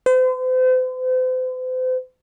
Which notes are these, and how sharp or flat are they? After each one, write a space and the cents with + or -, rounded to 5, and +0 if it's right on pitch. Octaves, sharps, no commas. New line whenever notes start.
C5 -40